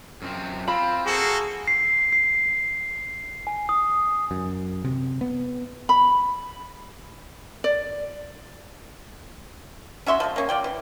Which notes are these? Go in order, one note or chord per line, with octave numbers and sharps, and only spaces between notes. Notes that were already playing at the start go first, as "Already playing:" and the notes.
F#2 C4
C4 F4 B5
A#3 F#4 G#4 A4
C7
C7
G#5
D#6
F#2
C3
B3
B5
D5
C#4 F#4 E5 C6
F3 G#3
A#3 C#4
F4 D5 G5
E3